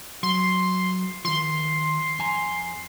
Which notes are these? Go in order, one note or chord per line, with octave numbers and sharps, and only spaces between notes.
F#3 C6
D#3 F3 C6
F2 G#5 A#5